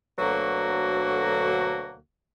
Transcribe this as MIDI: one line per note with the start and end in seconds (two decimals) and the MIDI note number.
0.19 1.96 38
0.19 1.96 47
0.19 1.96 50
0.19 1.96 54
0.19 1.96 58
0.19 1.96 66